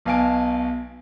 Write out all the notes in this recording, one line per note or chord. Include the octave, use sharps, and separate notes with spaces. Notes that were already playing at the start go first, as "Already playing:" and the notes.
B1 B2 F5 G#5 A5 D7